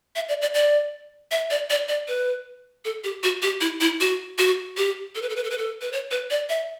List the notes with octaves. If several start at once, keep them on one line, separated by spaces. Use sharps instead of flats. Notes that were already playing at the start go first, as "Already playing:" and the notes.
E5
D5
D5
D5
E5
D5
D5
D5
B4
A4
G4
F#4
G4
E4
E4
F#4
F#4
G4
A4
B4
A4
B4
A4
B4
A4
B4
C#5
B4
D5
E5